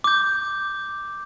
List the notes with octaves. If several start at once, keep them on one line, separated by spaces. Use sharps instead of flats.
D6 G6